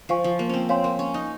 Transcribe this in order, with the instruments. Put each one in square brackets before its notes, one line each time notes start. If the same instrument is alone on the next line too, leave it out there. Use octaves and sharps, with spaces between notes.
[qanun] F3 [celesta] C5 F5 G#5 C#6
[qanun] F3
A#3
C4 C#4
[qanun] C4 [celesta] C#5 F5 G#5 C6
[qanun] A#3
C#4
D#4